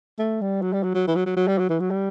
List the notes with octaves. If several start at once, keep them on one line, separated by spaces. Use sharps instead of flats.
A3
G3
F#3
G3
F#3
F#3
E3
F#3
F#3
F#3
G3
F#3
E3
F#3
G3